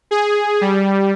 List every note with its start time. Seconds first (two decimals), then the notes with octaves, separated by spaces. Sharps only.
0.11 G#4
0.61 G3